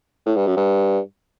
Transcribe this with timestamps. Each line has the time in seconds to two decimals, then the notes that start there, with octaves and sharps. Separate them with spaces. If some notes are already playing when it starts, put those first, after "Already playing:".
0.26 A2
0.36 G2
0.47 F#2
0.57 G2